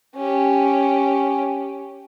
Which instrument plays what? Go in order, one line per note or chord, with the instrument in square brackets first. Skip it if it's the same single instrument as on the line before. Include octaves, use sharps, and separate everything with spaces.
[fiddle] C#4 G4